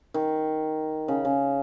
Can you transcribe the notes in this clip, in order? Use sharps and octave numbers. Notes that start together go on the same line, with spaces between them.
D#3
C#3
C#3